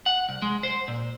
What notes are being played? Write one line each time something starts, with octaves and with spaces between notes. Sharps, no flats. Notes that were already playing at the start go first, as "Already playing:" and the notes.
F#5
C2
G#3
C5
A#2